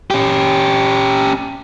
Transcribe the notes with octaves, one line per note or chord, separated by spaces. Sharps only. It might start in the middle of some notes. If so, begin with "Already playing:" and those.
C#4 G4